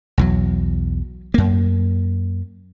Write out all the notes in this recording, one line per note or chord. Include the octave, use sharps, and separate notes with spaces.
B1 E2 F#3
F#2 A#3